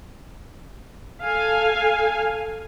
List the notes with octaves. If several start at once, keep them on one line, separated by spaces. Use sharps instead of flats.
A4 F5 G#5